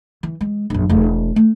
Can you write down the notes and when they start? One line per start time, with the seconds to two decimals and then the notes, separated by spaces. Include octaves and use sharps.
0.23 E3
0.41 G#3
0.70 A#1 F#2
0.89 E1 A3
1.36 A3